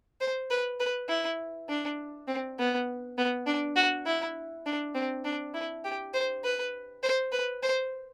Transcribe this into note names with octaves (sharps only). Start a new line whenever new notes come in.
C5
B4
B4
E4
D4
C4
B3
B3
D4
F#4
E4
D4
C4
D4
E4
G4
C5
B4
C5
B4
C5